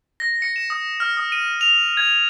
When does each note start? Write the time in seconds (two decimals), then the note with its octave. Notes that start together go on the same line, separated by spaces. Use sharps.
0.20 A#6
0.42 C#7
0.56 E7
0.70 D#6
1.00 F6
1.17 D#6
1.32 D#7
1.61 F7
1.97 G#6